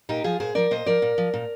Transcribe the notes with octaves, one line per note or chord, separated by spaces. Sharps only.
A#2 D#4 G4
F3 F4 G#4
A#2 G#4 C5
F3 A#4 D5
A#2 C5 D#5
F3 A#4 D5
A#2
F3
A#2